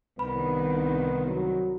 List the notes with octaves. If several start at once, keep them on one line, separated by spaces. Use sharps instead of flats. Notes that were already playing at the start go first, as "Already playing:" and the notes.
C2 D#3 B3 B5
F#3